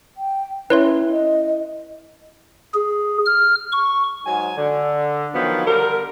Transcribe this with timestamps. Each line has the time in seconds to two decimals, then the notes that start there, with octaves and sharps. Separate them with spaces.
0.17 G5
0.70 C#4 E4 B4 C#5 E5 C6
1.11 D#5
2.74 G#4
3.25 F6
3.72 C#6
4.26 G#2 F#3 G#5
4.57 D3
5.35 D#3 F3 F#3 B3
5.66 D3 G3 A#4